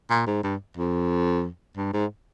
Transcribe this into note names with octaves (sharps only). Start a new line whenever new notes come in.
A#2
G#2
G2
F2
G2
G#2